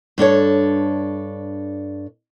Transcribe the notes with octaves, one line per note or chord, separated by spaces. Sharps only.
G2 D4 A4 C#5